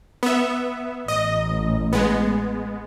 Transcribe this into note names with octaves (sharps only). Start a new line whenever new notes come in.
B3 E5
A1 D#5
G#3 B3